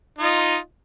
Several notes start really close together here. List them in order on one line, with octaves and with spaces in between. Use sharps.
D#4 F4 D#5